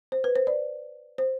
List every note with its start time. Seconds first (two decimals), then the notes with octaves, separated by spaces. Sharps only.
0.12 C5
0.24 B4
0.36 C5
0.47 D5
1.18 C5